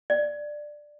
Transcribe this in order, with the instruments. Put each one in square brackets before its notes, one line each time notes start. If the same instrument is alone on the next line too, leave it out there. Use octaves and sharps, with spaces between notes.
[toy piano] D5